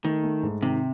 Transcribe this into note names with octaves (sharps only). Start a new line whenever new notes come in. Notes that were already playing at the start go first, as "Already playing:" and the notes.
D#3 A3
A3
G#2
C3 D#3